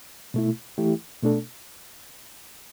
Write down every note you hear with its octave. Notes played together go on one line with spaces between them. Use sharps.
B2 A3 E4
E3 A3 E4 G4
B2 A3 D4 A4